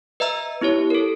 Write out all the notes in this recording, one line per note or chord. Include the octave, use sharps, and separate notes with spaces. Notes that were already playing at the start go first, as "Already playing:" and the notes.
B4 D#5 E5 A#5 E6
B3 E4 G4 C#5
A4 A#4